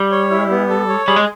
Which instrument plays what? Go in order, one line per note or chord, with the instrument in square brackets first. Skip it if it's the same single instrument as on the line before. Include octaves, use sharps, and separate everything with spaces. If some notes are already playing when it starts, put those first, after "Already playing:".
Already playing: [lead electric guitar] G3
[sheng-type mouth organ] C#5
E4
B3
A4
C#5
[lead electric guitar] G3 [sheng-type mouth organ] G#4
[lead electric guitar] G#3